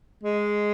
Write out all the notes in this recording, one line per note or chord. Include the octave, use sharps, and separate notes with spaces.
G#3